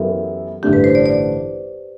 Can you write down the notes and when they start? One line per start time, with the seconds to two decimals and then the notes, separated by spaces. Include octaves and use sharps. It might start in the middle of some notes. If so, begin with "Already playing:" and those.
Already playing: F#2 E3 B3 E4 G4 A4
0.63 A1 G2 D3 A3 D4 G4
0.73 B4
0.84 C5
0.95 D5
1.06 D5